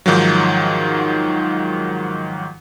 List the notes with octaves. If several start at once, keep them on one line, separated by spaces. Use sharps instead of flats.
G#2 D#3 F3 F#3